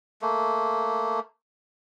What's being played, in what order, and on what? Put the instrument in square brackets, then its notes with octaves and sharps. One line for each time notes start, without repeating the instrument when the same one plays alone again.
[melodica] A3 A#3